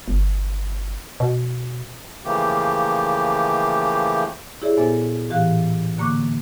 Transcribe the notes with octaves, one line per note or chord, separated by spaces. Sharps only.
G1
B2
C#3 E3 F3 A3 A#3 G4
E4 G4 G#4 C#5 D5 E5
A#2 B3 A4 C5 E5 G#5
A2 E3 G4 F5 F#6
D3 A#3 C#6 D6 F#6